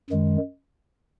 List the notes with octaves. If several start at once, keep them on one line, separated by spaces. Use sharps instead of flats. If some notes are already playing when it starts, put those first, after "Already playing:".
F#2 D#3 G#3